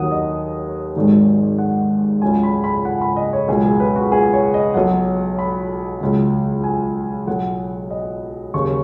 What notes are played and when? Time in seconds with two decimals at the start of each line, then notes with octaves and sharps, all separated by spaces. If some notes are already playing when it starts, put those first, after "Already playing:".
Already playing: D#2 D#3 F#3 F#5 D#6
0.11 D#5
0.96 G#1 G#2 D#3 F#3
1.58 F#5
2.22 C#2 C#3 F#3 G#5
2.43 B5
2.64 B5
2.85 F#5
3.01 B5
3.16 D#5
3.33 C#5
3.48 C#2 B2 F#3 G#4
3.65 G#4
3.80 B4
3.96 F#4
4.12 G#4
4.33 C#5
4.54 D#5
4.74 B1 B2 F#3 F#5
5.39 B5
6.01 C#2 C#3 F#3
6.64 G#5
7.27 B1 B2 F#3 F#5
7.90 D#5
8.54 D#2 C#3 F#3 C#6